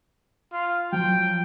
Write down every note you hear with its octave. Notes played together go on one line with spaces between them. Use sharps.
F4
F3 F#3 G5